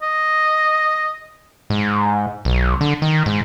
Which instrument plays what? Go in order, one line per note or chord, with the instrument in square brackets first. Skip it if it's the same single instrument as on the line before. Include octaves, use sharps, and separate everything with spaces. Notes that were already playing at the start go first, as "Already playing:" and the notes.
[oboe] D#5
[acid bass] G#2
B1
D3
D#3
G#2